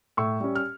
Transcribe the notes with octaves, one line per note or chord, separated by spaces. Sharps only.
A2 C#6 E6
G3 C#4
F6